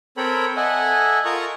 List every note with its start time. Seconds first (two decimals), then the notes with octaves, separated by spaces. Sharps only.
0.17 C4 A4 A#4 C#5 G5 B5
0.57 A4 D#5 E5 F#5 G#5
1.25 F4 A#4 A#5 C#6 D#6